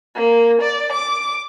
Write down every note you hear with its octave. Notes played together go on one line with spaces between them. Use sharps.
A#3
D5
D6